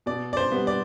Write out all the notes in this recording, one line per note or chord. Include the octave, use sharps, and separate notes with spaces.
B2 D5
D5
C5
G3 B3
D5